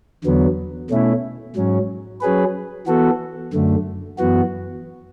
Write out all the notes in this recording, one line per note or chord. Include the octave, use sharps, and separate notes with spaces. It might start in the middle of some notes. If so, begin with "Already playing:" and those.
E2 D3 F#3 B3
B2 A3 C#4 E4
G#2 F#3 C#4
F#3 C#4 G#4 B4
E3 B3 F#4 A4
F#2 D3 A3
F#2 E3 B3 F#4